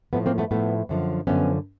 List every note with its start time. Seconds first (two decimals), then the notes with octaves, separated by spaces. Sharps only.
0.13 A2 F3 A3 B3
0.26 A#3 C4
0.38 A3 B3
0.51 A2 F3 A3 B3
0.89 F#2 D3 F3
1.27 F#2 D3 F3 B3 C#4